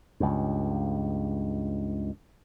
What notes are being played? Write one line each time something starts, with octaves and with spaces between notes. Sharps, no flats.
C#2 G2